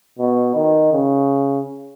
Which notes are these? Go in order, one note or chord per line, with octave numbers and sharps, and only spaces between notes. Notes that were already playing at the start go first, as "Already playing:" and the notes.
B2
D#3
C#3